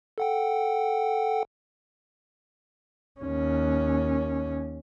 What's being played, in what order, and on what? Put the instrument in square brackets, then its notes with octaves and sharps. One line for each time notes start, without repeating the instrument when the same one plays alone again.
[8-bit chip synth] A4 F#5 G5
[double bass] D#2 C#4